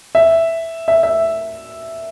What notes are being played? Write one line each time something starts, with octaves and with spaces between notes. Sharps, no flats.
E5
E5
E5